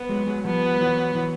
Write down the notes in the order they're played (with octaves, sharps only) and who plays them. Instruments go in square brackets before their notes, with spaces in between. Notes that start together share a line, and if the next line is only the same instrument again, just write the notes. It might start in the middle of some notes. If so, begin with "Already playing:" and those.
Already playing: [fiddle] B3
[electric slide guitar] F#3 G#3
F#3 G#3
[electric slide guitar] F3 G3 [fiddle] B3
[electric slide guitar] G3
E3 F#3
E3 F#3